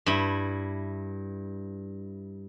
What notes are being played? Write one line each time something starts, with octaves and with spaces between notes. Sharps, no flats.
G2 E4